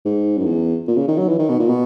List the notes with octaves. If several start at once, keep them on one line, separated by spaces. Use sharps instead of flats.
G#2
F#2
E2
A#2
C#3
D#3
F#3
E3
D#3
B2
A#2
B2